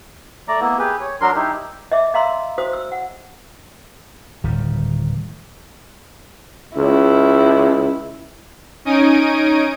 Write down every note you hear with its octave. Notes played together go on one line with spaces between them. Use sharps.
A3 D5 A#5
A#3 B3 E4
G4 G#4 B4
C#5
F#3 D4 A#4 C6
D#4 E4 G4
D#5 E5 D6
D#5 F5 A#5 C6 E6
F#4 C5 D#6
E6
F#5
D1 D#3 G3
C#2 E4
C#4 D#4 G#5 D#6 D7 D#7